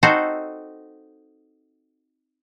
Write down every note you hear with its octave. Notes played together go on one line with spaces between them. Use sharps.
C4 D#4 F#4 A4 C5